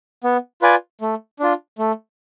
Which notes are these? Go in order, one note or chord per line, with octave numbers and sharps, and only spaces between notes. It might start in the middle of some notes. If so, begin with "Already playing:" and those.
B3
F4 B4 D5 G#5
A3
D4 F4
A3